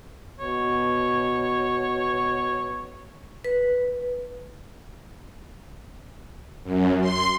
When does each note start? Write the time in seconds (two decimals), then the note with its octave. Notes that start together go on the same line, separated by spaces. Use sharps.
0.40 B2 C#5
3.44 B4
6.64 F#2
7.01 C6